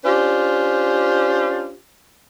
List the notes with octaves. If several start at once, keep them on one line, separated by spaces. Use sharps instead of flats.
C#4 D4 F4 G4 C5